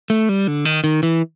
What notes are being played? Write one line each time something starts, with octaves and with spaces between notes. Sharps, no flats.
A3
G3
D3
D#3
D#3
E3